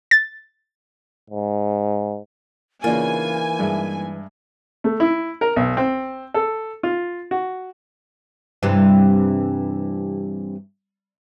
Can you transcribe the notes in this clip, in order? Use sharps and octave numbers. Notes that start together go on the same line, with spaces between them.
A6
G#2
C#3 E3 A#3 D4 D#4 F4 G#5
G2 G#3 E5
A3
E4
A#4
B1
C4
A4
F4
F#4
G2 C3 E3